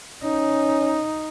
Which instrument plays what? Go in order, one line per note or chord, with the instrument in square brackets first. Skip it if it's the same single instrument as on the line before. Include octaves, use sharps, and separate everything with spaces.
[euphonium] C#4 [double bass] D#4